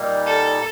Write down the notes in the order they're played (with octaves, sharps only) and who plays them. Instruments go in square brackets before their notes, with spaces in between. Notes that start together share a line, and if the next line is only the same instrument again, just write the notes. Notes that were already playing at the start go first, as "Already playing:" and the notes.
Already playing: [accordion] A#2 G3 A#3 D#4
[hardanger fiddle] A4